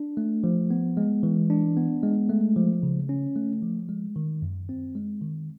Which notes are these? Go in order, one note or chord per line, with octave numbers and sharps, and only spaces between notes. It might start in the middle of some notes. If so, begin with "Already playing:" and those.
Already playing: D4
A3
F3
B3
G#3
E3
D4
B3
G#3
A3
F3
C#3
C#4
A3
F3
G#3
D#3
F#2
C4
G#3
D#3